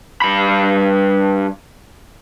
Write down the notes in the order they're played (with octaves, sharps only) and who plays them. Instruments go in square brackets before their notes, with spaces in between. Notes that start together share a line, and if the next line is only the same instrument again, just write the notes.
[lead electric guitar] G2 B5